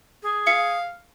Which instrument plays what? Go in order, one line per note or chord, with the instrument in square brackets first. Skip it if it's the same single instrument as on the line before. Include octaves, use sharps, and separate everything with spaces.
[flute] G#4
[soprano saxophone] F5 [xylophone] C#7